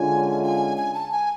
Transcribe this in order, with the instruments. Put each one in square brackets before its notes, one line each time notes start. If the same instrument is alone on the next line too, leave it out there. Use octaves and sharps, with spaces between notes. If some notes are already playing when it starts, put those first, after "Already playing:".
Already playing: [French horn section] D3 G#3 C#4 F4 [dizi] G#5
[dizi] G#5
G#5
A5
G#5